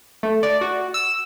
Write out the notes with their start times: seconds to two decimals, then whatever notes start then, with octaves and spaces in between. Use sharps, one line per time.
0.23 A3
0.43 D5
0.61 F#4
0.94 E6